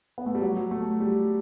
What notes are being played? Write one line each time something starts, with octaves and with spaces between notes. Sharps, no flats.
B3
A3
G3
F#3
A3
G3